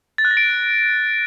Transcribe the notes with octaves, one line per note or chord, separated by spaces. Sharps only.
A6
F#6
A#6
D7